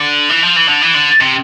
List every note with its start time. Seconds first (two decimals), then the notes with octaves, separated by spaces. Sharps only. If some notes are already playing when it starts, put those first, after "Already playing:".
Already playing: D3
0.29 E3
0.42 F3
0.56 E3
0.68 D3
0.81 E3
0.94 D3
1.21 C3